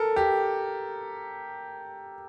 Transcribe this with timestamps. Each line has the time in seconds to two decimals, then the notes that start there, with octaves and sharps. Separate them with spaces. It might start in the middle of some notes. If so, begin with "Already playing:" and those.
Already playing: A4 A#4
0.16 G4